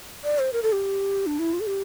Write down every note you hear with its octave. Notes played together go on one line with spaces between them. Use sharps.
D5
C5
A#4
A4
G4
D4
E4
F4
A4
G4